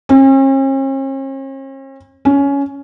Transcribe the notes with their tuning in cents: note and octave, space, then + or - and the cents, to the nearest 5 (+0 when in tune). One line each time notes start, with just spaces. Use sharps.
C#4 -45
C#4 +15